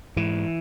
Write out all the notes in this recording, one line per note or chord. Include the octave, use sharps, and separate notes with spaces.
G#2 E3